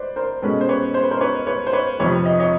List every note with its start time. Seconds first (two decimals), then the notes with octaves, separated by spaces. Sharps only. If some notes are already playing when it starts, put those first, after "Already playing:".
Already playing: B4 C5 D5
0.16 A#4 C5
0.42 B2 G#3 C#4 A4 B4
0.61 C5
0.69 B4 C#5
0.94 C5
1.03 B4
1.11 A#4 C5
1.21 B4 C#5
1.47 B4 C#5
1.67 C5
1.73 B4 C#5
1.99 F2 C3 F3 B4 C#5
2.26 D#5
2.40 C#5 D#5